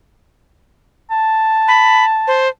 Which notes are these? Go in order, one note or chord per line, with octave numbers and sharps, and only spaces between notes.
A5
B5
C5